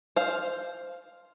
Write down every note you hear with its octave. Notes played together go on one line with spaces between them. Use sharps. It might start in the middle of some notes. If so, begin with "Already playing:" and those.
C5 F5